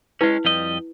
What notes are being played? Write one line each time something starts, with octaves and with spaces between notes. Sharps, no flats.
G#3 C#4 E4 B4
F2 G3 D#5